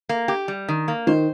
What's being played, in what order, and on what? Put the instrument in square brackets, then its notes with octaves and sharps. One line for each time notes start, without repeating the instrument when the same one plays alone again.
[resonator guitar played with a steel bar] A#3
G4
G3
D#3
A#3
[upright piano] D#3 [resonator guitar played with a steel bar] C5